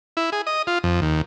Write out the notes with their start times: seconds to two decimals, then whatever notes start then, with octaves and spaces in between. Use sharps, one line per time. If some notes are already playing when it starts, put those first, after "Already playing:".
0.17 E4
0.32 G#4
0.47 D#5
0.67 F4
0.84 F2
1.02 D#2